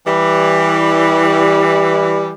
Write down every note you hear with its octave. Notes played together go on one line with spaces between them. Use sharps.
E3 G3